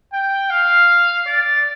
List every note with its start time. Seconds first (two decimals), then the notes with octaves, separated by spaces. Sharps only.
0.13 G5
0.50 F5
1.27 D5